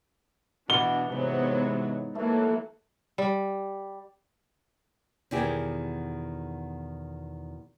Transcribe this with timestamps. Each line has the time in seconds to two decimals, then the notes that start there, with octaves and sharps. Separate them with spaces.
0.70 B2 E3 D4 F#4 G7
1.09 G#2 C3 E3 F#3 G#3 B3 B5
2.15 E3 F#3 A3 A#3
3.18 G3
5.31 E2 B2 D#3 E4 G4 G#4